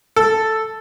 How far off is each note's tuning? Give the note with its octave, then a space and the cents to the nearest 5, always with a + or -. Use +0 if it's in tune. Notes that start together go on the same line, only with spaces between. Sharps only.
A4 +0